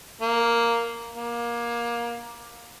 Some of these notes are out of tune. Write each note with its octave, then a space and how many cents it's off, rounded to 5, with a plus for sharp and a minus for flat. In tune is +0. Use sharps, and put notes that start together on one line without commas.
A#3 +0
A#3 +20